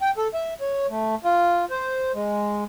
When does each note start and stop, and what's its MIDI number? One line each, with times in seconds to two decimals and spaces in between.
0.02 0.11 79
0.17 0.28 69
0.34 0.54 76
0.61 0.87 73
0.90 1.15 57
1.24 1.65 65
1.70 2.12 72
2.15 2.64 56